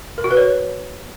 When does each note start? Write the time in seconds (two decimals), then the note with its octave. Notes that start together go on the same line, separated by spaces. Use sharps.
0.18 A#4
0.24 F#4
0.31 B4
0.37 C#5